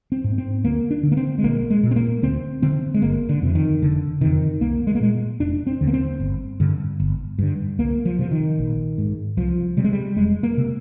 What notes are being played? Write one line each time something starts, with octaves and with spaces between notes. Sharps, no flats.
C4
G#2
C4
D2 A#3
D4
D3
A#3
C4
G#3
A#1 A#3
G#3
A#2
C4
A#3
D2 C4
D3 C4
G#3
G1 A#3
D3
F2 C3
D#3
F1 D3
F2 C3 D#3
C2 A#3
G#3
A#3
A#2 G#3
F1 D4
C4
D#2 D3
A#3
C4
G1
G2 D3
G1
G2 D3
C2 A#3
F3
C3 F3
D#3
A#1
G#2
C2 F3
C3 G3
G#3
G3
F1 G#3
A#3
C3